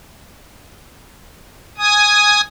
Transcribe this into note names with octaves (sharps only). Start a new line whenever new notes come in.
G#5 D#6